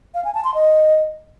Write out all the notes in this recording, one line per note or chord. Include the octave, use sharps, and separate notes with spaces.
F5
G#5
A5
C6
D#5